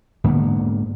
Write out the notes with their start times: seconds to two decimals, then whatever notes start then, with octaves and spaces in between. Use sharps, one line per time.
0.24 G#2 D3 A#3 B3